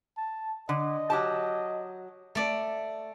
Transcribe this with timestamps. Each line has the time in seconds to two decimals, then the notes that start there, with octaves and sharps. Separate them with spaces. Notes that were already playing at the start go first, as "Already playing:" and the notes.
0.17 A5
0.69 D3 D#5
1.10 F#3 G4 A5
2.35 A3 D5